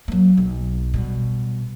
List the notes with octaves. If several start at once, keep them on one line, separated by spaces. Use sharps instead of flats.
F#3 A#3
B1
B2 G3